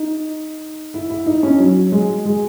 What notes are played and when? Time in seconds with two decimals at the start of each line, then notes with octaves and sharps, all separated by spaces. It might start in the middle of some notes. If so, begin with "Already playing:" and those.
Already playing: D#4
0.94 E4
1.10 E4
1.26 D#4
1.43 C#4
1.59 F#3
1.92 G#3
2.25 G#3